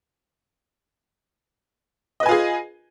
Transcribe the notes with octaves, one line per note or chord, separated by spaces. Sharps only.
F4 G#4 B4 D#5 G#5